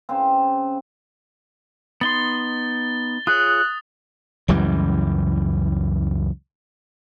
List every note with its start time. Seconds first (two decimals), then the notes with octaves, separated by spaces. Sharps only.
0.09 C#3 C4
2.01 B3 D#4 C6 A6 G7
3.27 F4 G#4 C#5 D#6 F#6
4.48 C#2 F#2 E3 G3